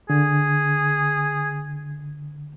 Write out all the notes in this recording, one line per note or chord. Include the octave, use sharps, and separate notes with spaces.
D3 G#4